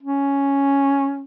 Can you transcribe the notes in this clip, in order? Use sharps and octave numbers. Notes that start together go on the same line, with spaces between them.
C#4